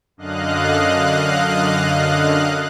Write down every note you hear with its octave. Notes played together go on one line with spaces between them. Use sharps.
F#2 D3 D#5 F5 F#6